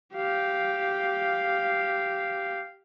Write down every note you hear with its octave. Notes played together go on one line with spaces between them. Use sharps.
G4 F5